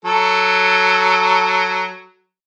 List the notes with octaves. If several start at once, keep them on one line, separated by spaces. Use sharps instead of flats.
F#3 A4